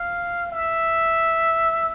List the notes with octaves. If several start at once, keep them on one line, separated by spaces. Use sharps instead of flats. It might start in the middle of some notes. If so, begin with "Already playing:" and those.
Already playing: F5
E5